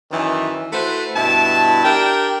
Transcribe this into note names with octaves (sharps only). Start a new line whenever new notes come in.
F#2 D#3 E3
A3 E4 F#4 B4 C5
G2 B2 E4 A5
D4 G4 A#4 G5